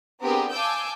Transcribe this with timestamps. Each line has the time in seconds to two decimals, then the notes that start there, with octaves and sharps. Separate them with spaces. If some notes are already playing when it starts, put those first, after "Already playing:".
0.21 B3 C4 D4 G4 G#4 A#4
0.52 F5 G#5 A5 D6 E6 G6